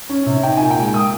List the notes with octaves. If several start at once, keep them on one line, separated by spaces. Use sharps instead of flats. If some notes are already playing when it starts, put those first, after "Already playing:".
C#4
C3
D#4 G5
A#2 G#5
G5
G#3
A#3 D#6